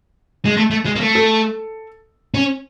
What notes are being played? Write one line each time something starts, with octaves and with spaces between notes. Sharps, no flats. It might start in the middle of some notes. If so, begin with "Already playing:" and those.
G#3
A3
A3
G#3
A#3
A3
A4
C#4